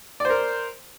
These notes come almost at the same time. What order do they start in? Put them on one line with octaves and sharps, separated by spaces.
D5 C5 A#4